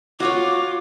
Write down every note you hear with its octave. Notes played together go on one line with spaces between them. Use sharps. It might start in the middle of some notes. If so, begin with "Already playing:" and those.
F4 F#4 C#5 D6